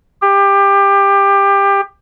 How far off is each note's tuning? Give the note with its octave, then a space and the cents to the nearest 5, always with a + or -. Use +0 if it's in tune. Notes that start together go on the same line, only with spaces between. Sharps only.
G4 +20